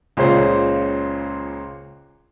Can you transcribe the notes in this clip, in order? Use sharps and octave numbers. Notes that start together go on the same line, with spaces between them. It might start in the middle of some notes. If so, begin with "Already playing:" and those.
C#2 A#2 C#3 C#4 C5